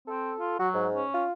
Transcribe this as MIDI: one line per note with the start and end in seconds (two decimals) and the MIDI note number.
0.08 0.33 60
0.08 0.58 69
0.39 0.57 65
0.59 0.86 54
0.59 0.68 66
0.74 1.03 44
0.95 1.23 61
1.14 1.32 65